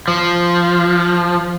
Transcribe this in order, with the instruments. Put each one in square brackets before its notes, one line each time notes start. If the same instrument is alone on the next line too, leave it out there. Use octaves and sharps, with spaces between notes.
[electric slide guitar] F3